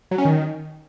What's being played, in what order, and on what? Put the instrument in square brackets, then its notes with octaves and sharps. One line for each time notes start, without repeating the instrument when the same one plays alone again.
[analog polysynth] F#3
C#4
D#3